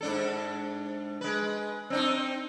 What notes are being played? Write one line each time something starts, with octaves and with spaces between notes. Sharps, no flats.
G#2 D4 A4
G#3 B4
C4 D4 D#4